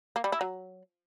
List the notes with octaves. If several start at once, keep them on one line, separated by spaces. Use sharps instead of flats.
A#3
G3
E4
F#3